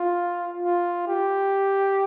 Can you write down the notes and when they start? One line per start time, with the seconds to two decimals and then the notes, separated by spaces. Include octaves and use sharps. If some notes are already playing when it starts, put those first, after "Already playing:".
Already playing: F4
0.63 F4
1.07 G4